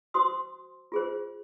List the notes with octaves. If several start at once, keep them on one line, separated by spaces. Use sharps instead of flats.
F#4 C5 C6 D#6
F4 G#4 C5